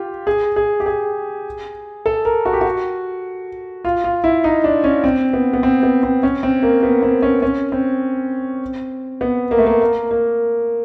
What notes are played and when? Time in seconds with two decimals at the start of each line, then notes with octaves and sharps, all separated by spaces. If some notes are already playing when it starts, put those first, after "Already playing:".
Already playing: F4 G4
0.27 G#4
0.56 G#4
0.80 G4
0.86 G#4
2.06 A4
2.25 A#4
2.45 F#4
2.53 G4
2.61 F#4
3.85 F4
4.04 F4
4.24 E4
4.44 D#4
4.64 D4
4.84 C#4
5.04 C4
5.33 B3
5.53 B3
5.63 C4
5.83 B3
6.03 C4
6.23 C#4
6.43 C4
6.63 A#3
6.83 B3
7.03 C4
7.22 C#4
7.42 C#4
7.72 C4
9.21 B3
9.51 A#3
9.58 A3
9.66 A#3
9.81 A#3
10.11 A#3